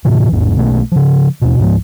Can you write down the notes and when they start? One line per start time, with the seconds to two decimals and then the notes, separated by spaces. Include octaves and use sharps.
0.05 A2 C3 E3
0.32 A1 E2 G#2
0.56 B1 B2 A3 A#3
0.92 C#3 F3
1.42 D#2 B2
1.59 C#2 G#2 F3